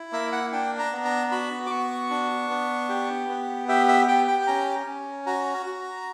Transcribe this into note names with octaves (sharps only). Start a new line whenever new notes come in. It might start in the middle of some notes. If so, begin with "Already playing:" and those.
Already playing: E4
A#3 E5
F#5
D4 G5
A#5
B3
A#5
F#4 B5
D6
B3 C#6
D4
B3
G4
B3
G4 E5
E5
G4 G5
G5
G5
C#4 A#5
C#4
F#4 A#5
F#4